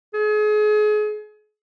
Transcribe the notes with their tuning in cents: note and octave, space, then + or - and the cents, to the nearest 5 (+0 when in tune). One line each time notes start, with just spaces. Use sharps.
G#4 +35